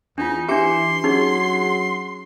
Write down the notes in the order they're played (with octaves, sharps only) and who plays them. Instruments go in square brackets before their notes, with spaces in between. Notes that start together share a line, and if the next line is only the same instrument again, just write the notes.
[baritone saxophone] E2 [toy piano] D4 F4 [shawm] D#4
[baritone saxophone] E3 [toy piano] D4 G4 [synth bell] E5 D6 C#7 [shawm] C6
[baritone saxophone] F#3 [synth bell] C#4 G#4 [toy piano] D#4